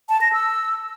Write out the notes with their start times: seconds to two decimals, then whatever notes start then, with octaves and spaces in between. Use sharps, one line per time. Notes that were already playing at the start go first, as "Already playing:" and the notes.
0.09 A5
0.21 A#6
0.33 E6